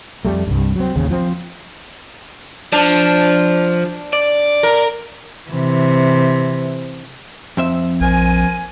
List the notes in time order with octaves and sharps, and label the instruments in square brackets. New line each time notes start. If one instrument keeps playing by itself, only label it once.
[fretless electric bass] F2 G3 A3
C2 G2
F#3 C4
A1 D#2 C#3
F3 C4
[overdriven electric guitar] F3 [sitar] D4
[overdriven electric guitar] D5
[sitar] A#4
[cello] C3 E3
[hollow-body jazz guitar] F2 C4 E5
[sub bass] A#1 [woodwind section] A#4 C5 G#5